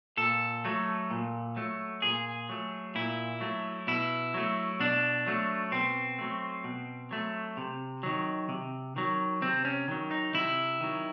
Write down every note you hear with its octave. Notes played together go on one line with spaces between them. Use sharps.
A#2 A4
F#3 A3
A#2
F#3 A3
A#2 G#4
F#3 A3
A#2 E4
F#3 A3
B2 E4
F#3 A3
B2 D4
F#3 A3
B2 C4
F#3 A3
B2
F#3 A3
C3
D#3 F#3
C3
D#3 F#3
C3 C4
C#4
D#3 F#3
D#4
C3 E4
D#3 F#3